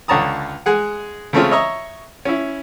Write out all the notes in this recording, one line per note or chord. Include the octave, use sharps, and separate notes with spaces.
C#2 D3 C#5 A5 A#5 D#6
G#3 G#4 F#5
C#3 G#3 A3 C4 C#4 F4
C#5 D#5 E5 A#5 C#6
C#4 E4